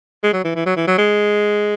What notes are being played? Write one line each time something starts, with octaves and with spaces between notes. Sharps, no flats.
G#3
F#3
E3
E3
F#3
E3
F#3
G#3